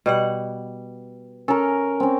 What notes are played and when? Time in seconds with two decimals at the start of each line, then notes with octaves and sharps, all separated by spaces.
0.06 B2 G3 F#5
1.48 C#4 A4 A#4
2.00 C4 C#4